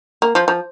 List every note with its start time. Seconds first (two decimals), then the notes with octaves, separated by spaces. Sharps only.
0.22 A#3
0.35 F3
0.48 F3